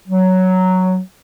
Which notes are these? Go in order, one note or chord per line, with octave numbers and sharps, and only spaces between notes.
F#3